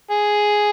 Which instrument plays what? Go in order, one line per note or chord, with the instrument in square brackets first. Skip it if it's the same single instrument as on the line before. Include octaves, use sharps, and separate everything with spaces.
[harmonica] G#4